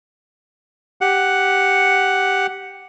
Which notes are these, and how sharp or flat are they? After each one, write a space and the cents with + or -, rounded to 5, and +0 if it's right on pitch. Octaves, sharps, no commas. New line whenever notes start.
G4 +0 F#5 +5